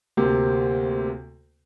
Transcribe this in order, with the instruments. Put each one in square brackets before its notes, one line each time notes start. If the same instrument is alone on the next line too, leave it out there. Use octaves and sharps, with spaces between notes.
[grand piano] D2 C3 A#3 C4